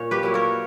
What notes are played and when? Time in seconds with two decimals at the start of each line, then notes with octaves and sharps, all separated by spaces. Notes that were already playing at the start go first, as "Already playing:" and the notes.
Already playing: A#2 C#5
0.11 G4 B4
0.23 F#3 A#3 E4
0.34 A#4 C#5